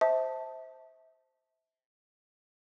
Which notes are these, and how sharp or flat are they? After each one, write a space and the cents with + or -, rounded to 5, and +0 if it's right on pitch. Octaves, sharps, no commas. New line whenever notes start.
C5 +0 E5 -25 A5 +0